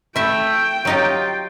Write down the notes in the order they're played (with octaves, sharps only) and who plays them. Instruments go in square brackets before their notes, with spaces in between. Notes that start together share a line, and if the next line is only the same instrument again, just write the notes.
[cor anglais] A3 [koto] E4 E5 [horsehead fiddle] G5
[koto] F#3 D#4 G4 [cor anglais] F4